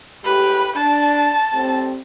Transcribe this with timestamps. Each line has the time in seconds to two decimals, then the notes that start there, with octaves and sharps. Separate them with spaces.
0.24 A2 G#3 G4 B4
0.76 D4 A5
1.53 A2 G3 C4